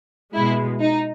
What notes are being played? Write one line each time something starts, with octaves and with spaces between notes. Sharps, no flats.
B2 G#3 E4
D#4